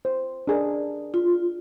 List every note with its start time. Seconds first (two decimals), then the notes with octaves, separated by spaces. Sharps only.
0.05 C5
0.47 D4 G#4 A#4
1.14 F4